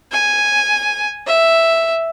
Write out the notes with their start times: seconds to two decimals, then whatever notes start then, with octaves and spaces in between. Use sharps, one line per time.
0.12 G#5
1.27 E5